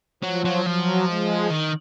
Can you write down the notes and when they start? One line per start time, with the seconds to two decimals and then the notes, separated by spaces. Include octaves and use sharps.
0.23 F3 F#3
0.45 F#3
0.66 F3 F#3
1.09 G#3
1.51 D#3